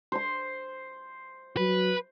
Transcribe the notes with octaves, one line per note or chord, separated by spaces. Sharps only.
C5 C6
F#3 B4